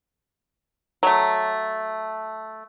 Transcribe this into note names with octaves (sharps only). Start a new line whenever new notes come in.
F#3 A3